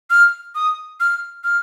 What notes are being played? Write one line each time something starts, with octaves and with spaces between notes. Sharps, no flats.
F6
D#6
F6
F6